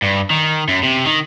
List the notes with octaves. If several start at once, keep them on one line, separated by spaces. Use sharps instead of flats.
G2
D#3
F#2
C3
D#3